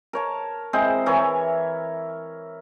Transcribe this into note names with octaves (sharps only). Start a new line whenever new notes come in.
A#4 C#5 A5
G#3 C4 E4 C5
E3 E4 A#4 C#5